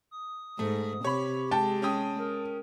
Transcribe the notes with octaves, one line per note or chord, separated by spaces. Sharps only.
D#6
G#2 A3
C3 G4 C#5 B5
G#3 G5 A5
C#4 G5 D#6
A#4